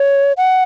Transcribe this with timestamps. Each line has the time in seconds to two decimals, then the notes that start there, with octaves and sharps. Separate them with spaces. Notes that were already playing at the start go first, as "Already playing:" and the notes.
Already playing: C#5
0.37 F#5